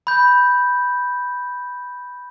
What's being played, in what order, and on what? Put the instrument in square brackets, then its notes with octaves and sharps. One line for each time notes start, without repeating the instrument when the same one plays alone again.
[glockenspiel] B5 G6